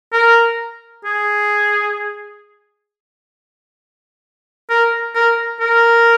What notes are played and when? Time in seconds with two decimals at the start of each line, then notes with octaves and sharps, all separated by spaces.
0.13 A#4
1.05 G#4
4.70 A#4
5.15 A#4
5.61 A#4